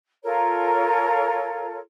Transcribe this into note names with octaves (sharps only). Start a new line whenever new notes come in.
F4 A4 A#4 C#5